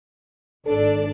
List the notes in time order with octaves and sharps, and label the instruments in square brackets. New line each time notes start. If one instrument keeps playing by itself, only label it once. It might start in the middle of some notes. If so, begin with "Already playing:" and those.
[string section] G#1 D4 D5 [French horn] A4